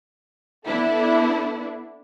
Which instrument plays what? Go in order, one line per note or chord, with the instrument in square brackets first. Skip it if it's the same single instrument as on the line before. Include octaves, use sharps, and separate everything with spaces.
[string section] B3 D4 E4 A4